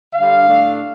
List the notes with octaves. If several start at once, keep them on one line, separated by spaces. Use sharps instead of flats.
D3 G3 D4 F5
A2 A3 D4